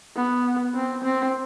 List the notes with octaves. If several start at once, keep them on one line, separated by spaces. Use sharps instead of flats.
B3
C4
C4